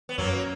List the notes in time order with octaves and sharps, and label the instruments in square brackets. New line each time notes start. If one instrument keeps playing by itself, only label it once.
[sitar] B3
[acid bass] F#2 [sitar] F#3 A#3